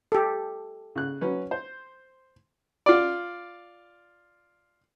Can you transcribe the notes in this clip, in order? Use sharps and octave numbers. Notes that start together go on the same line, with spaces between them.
G4 A4
C#3 F#6
F#3 C#4 B4
C5
F4 D5